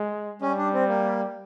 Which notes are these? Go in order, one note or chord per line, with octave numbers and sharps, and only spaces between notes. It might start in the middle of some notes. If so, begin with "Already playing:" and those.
Already playing: G#3
G3 C#4
D4
C4
A#3